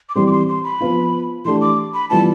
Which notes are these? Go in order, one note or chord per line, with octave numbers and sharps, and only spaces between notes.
D6
E3 G3 C4 G4 C6
D6
C6
C6
B5
F3 B3 F4
E3 A3 D4 G4 C6
D6
B5
E3 G3 B3 F4 A5